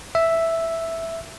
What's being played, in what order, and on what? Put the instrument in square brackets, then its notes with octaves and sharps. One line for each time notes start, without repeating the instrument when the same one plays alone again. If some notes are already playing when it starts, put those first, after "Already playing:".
[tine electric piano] E5